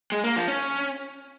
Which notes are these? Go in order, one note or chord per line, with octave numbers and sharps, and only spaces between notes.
G#3
A#3
F3
C#4